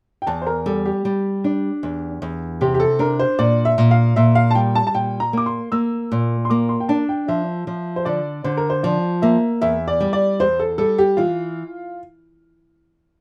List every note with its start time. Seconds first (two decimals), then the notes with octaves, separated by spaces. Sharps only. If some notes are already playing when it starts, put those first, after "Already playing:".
0.22 G5
0.27 E2 A5
0.42 C5
0.47 A#4
0.66 G3 A4
0.86 G4
1.05 G3
1.44 D4
1.83 E2
2.22 E2
2.61 C3 G4
2.74 G4
2.80 A4
2.99 D4 A#4
3.20 C5
3.39 A#2 D5
3.65 E5
3.78 A#2
3.91 F5
4.16 A#2 E5
4.35 F5
4.51 A5
4.55 G3 G5
4.75 A5
4.87 A5
4.94 A#2 G5
5.20 A#5
5.33 A#3 D6
5.46 C6
5.72 A#3 E6
6.12 A#2
6.45 C6
6.50 A#3 D6
6.69 C6
6.80 G5
6.89 D4 A5
7.09 G5
7.28 F3 E5
7.67 F3
7.96 C5
8.05 D3 D5
8.44 D3 C5
8.57 A#4
8.70 C5
8.83 F3 D5
9.22 A#3 E5
9.61 E2 E5
9.88 D5
10.00 G3
10.13 D5
10.40 E2 C5
10.59 A4
10.78 G3 A4
10.98 G4
11.17 E3 F4